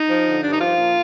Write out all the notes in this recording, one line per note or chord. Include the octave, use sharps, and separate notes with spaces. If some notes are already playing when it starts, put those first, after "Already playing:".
Already playing: D#4
F3
D3
G2 D4
D#4
F3 F4
A#2